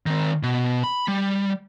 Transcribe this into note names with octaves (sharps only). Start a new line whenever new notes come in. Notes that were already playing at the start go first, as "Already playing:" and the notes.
D#3 C4
B2
B5
G3